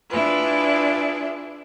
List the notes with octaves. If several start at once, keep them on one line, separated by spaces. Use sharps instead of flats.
D4 E4 F4 G#4 B4